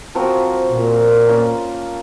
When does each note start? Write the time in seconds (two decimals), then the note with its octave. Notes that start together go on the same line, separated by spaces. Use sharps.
0.15 F3 C4 F#4 A#4
0.71 A#2
1.28 A#3 C#4 F4